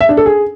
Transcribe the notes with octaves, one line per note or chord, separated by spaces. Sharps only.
E5
D4
A4
G#4